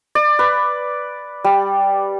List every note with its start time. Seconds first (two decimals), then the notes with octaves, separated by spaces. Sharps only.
0.15 D5
0.39 B4
1.44 G3